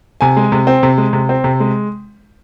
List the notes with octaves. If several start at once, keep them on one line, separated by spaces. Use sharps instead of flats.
C3 G#5
G#3
C3
C4
C3
G#3
C3
C4
C3
G#3